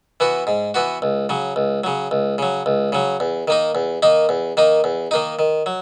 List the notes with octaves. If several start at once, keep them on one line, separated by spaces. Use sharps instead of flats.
E3 B3 F#4
G#2
E3 B3 F#4
C#2
C#3 F#3
C#2
C#3 F#3
C#2
C#3 F#3
C#2
C#3 F#3
E2
D#3 A#3 D#4
E2
D#3 A#3 D#4
E2
D#3 A#3 D#4
E2
D#3 A#3 D#4
D#3
F#3